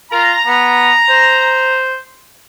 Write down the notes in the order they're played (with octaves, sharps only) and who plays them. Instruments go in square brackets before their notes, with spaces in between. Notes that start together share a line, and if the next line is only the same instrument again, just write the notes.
[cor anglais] F4 [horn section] A#5
[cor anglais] B3
C5